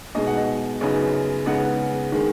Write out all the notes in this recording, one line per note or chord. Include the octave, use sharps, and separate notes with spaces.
B2 G#3 D#4 D#5
F#5
D#5
F#2 C#3 B3 D#4
C#3 G#3 B3 D#4 F#5
D#3 G#3